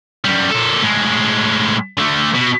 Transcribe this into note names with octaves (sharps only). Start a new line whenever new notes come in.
F#2 G3
A#2 A4
A2 G#3
D3 A3
B2